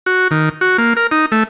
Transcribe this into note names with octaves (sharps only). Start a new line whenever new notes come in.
F#4
D#3
F#4
A#3
A#4
D#4
A3